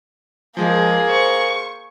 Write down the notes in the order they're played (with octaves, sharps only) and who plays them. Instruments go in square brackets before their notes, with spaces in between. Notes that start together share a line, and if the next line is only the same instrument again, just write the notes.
[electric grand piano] F3 G#3 [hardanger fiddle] A#3 G#4
[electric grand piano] C5 [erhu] C#6